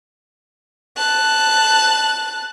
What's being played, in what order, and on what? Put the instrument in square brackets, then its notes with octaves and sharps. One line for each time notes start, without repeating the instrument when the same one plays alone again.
[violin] A5 F#6